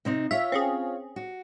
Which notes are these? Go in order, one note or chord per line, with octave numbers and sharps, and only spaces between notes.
C3 C4 D#4
F4 C#5 E5
C4 C#4 G#4
F#4